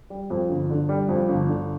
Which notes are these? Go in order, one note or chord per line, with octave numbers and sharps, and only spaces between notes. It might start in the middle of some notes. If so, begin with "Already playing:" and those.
G3
F2
G1
D3
G3
F2
G1
D3